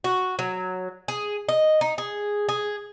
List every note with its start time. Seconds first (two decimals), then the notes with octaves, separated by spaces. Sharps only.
0.04 F#4
0.39 F#3
1.08 G#4
1.49 D#5
1.81 D#4
1.98 G#4
2.49 G#4